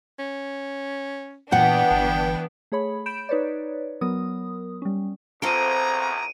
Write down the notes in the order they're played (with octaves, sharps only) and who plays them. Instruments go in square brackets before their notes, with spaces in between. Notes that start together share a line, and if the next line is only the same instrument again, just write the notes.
[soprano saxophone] C#4
[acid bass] A#2 [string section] E3 B3 D4 [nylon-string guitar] F#5 [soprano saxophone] G5
[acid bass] G1
[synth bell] A3 G#4 C#5 B5
B5 G6 D7 E7
D#4 B4 C#5 D5
F#3 B3 A#4 D#6
G3 C#4
[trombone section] A#1 E2 [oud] C4 F4 A4 [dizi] A#5 [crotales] D7 D#7